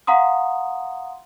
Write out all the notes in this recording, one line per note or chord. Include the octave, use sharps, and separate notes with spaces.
F5 F#5 A#5 C6 D#6